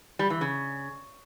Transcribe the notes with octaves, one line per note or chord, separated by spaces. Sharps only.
G3
E3
C#3